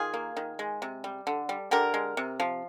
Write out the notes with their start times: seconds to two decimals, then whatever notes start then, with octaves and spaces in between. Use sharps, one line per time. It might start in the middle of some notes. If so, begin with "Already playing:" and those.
Already playing: D#3 F4 G#4
0.14 A#3
0.37 D#3
0.59 G#3
0.82 C3
1.04 G3
1.27 D3
1.49 G3
1.71 D3 G4 A#4
1.94 G#3
2.17 C3
2.40 F3